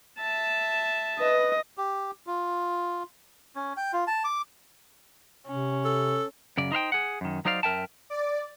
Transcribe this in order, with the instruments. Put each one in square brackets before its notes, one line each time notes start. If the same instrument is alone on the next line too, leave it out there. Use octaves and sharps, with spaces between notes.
[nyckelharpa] E5 A5
[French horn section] B4 [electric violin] D#5
[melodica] G4
F4
C#4
G5
F4
A5
D6
[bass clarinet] C3 [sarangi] C#4
[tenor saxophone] A4
[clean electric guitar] F#2 C#3 D5
D#4 C5 F5 G5
G#4 F#5
F#2 D#3
F#3 D#4 C5 D5 F5
F#2 A#4 E5 G5 A5
[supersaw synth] D5